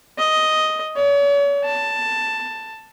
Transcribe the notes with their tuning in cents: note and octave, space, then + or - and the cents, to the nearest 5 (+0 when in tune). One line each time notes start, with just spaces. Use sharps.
D#5 +5
C#5 +40
A5 +10